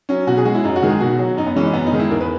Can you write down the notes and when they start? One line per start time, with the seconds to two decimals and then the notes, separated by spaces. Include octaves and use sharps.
0.09 F#3 C#4
0.27 B2 F#4
0.37 G#4
0.45 G#3 F#4
0.54 E4
0.64 F#2 D#4
0.76 F#4
0.82 D#3 G#3
0.89 G#4
1.00 B2 F#4
1.19 F#3
1.37 F#2 D#4
1.47 B3
1.56 E3 G#3 C#4
1.65 D#4
1.74 F#2 B3
1.87 D#4
1.92 D#3 G#3
1.99 E4
2.11 E2 A#4
2.21 B4